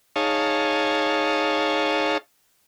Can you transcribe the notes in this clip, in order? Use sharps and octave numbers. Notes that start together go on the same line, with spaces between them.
D#4 G#4 C#5 F5 A5